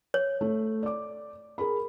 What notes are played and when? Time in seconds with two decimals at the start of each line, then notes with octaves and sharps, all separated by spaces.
0.14 C#5
0.41 A3
0.83 D5 D6
1.58 G#4 A#4 B5